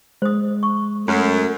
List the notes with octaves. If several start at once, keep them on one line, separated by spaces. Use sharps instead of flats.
G#3 C5 D#6
C#6
F#2 A3